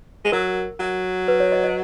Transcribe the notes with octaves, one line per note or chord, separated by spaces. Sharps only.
G#3
F#3 A#4
F#3
B4
C#5
D#5
D#5